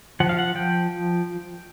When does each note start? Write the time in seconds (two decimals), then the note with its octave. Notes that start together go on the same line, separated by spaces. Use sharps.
0.20 F3 F#5
0.29 F5
0.39 F#5
0.55 F3 G5